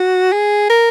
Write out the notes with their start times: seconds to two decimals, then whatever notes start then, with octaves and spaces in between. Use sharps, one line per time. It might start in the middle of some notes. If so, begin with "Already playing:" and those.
Already playing: F#4
0.32 G#4
0.70 A#4